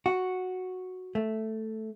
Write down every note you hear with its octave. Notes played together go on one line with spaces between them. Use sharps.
F#4
A3